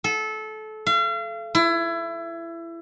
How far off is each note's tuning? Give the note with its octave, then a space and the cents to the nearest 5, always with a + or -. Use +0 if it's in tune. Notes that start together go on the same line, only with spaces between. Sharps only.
A4 -25
F5 -40
E4 +25